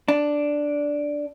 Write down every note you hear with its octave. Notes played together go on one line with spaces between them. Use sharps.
D4